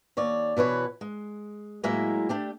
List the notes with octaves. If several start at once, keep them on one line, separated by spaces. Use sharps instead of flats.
D#2 C#5 D5
B2 E3 B4 C#5
G#3
A2 F#3 G#3 A#3 E4 E5
A3 D4 G4